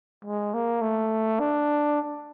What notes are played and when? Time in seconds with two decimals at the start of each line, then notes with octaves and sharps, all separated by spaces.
0.25 G#3
0.54 A#3
0.82 A3
1.40 D4